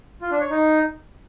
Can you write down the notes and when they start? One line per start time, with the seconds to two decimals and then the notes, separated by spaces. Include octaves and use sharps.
0.21 F4
0.31 D4
0.41 C#5
0.50 D#4